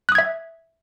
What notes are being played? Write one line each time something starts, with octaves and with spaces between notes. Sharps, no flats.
E5 D#6 F#6 G#6